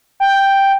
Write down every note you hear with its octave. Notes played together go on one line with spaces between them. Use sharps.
G5